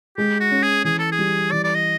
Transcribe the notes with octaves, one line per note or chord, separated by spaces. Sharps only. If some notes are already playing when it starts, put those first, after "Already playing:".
G#3 G4
F#4
C#4
G#4
E3 G#4
A4
G#4
G3
E3 D5
D5
D#5